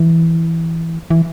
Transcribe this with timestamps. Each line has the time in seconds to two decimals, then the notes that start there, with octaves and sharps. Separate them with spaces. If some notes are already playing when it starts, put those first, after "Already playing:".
Already playing: E3
1.10 E3